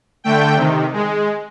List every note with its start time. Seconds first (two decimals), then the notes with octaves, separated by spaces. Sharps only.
0.24 D3 A3 G5
0.56 C3 D#3
0.93 G#3